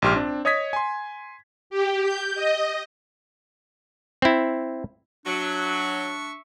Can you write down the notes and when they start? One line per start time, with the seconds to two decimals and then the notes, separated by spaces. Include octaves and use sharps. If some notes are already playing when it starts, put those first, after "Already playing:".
0.02 A#1 G#2 G4 C6 F6
0.16 C4 D4
0.45 C#5 D#5 D#6 G#6 B6
0.73 G#5 C6
1.70 G4
2.03 G6
2.35 D#5
4.22 C4 E4
5.26 F#3 D4 E5 C#6